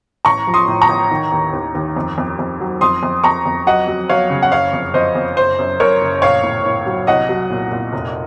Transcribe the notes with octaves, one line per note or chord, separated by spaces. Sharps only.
A1 A#5 C#6
F3
C6 D#6
A2
A#5 C#6
A1
D#3
D#2
D#2
D#2
F2
F2
F2
F#3
F2 C6 D#6
F2
F2 A#5 C#6
F2
F#3 D#5 F#5
F#3
F#3 C#5 F5
C#3
F#5
F#1 C#5 F5
F2
F2 C5 D#5
F2
F#1 C5
F#2
F#2 A#4 C#5
F#1
A#1 C#5 F5
A2
A2
F#3
C2 D#5 F#5
F#3
A#2
A#2
F1